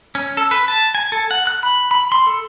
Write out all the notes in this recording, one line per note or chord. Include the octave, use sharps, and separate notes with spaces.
C#4
A4
B4
A5
G#5
A4
F#5
F#6
B5
B5
C6
A4